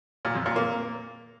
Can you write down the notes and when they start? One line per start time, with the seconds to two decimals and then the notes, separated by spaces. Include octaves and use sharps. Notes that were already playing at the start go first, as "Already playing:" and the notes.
0.25 A#2
0.35 F2
0.46 A#2
0.56 A#3